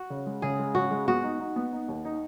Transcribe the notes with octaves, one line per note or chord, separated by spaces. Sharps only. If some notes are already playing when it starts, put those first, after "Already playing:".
Already playing: F#4
C#3
G#3
C#3 G#4
G#3
C#3 F#4
G#3
B3 F#4
D#4
D#4
B3
D#4
D#2
D#4